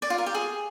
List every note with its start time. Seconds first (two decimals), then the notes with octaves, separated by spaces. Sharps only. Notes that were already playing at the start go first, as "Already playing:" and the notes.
0.02 D5
0.10 F4
0.18 A#4
0.26 G4
0.35 G#4